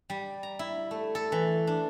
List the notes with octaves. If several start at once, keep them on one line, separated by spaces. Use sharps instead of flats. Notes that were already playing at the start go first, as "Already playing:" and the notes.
G3
A#5
E4
A3
A4
E3
D4